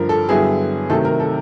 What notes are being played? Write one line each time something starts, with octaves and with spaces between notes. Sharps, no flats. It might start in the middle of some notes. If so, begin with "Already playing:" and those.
Already playing: G2 D3 F3 A#4
A4
G2 D3 F#3 B3 E4 G#4
C3 D#3 F#3 A3 A4
A#4
A4